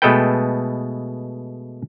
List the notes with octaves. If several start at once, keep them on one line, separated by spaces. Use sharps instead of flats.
B2 G#3 A3 A4 B4 G5